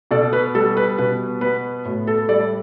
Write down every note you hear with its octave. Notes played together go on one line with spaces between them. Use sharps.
B2 A4 D5
B4
G3 A4
B4
B2 B4
B3 B4
A2
A4
G3 A4 D5